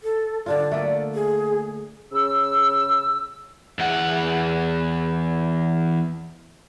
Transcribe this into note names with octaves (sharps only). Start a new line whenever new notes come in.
A4
D3 D4 F4 D5
A3 A#3 A4
G#4
C#3 E6
E2 F#5